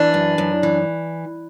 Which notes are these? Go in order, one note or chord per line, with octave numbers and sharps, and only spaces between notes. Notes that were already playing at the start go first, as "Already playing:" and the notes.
Already playing: E3 D4
F#2
F#2
E3